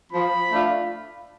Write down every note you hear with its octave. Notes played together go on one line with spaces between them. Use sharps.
F3 B5
A3 D4 F4